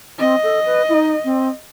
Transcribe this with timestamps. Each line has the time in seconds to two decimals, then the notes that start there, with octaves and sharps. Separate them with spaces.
0.19 C4 D#5
0.43 A4
0.65 B4
0.89 E4
0.94 D#4
1.24 C4